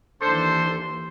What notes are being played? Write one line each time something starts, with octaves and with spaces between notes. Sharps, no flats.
D#2 E3 D4 A4 C5 C6